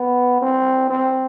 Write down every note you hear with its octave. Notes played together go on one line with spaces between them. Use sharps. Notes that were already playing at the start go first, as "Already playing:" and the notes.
Already playing: B3
C4
C4